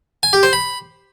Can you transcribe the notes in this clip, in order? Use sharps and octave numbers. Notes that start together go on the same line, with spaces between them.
G#5
G4
C5
B5